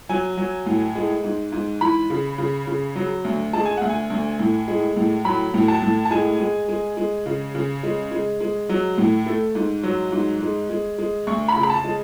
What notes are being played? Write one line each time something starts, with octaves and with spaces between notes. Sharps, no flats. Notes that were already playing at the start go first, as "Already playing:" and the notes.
F#3 G#5
F#3
A2
G#3
G#2
G#2
E3 B5
C#3
C#3
C#3
F#3
D2
G#3 A5
G#5
D2 F#5
G#5
D2
A2
G#3
A2
F#3 B5
A2
A5
A2
A5
G#3 G#5
G#3
G#3
G#3
C#3
C#3
G#3
G#3
G#3
F#3
A2
A3
G#2
F#3
G#2
G#3
G#3
G#3
D2 C#6
B5
C#3
B5
A5
G#3